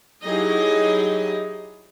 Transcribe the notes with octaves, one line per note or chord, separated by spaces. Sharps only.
F#3 D#4 E4 G4 G#4 D#5